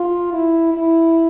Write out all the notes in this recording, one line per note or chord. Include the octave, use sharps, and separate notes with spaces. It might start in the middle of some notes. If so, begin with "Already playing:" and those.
Already playing: F4
E4
E4